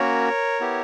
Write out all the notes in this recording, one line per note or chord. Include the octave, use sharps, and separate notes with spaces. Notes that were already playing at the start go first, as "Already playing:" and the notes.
Already playing: A#3 C#4 F#4 A#4 C#5
B3 E4 G4